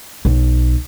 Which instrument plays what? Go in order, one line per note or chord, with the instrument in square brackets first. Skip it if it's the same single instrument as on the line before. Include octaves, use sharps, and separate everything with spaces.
[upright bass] B1